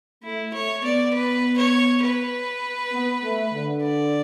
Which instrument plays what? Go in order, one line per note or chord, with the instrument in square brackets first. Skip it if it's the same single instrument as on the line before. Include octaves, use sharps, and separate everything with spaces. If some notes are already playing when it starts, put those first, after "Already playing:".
[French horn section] A3 [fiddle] E4
[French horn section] A3 [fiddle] C#5
[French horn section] B3 [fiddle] D5
[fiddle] B4
C#5
B4
[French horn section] B3
A3
D3
[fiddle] D5